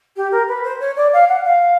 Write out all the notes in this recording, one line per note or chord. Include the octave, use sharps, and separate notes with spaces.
G4
A#4
B4
C5
C#5
D5
F5
F#5
F5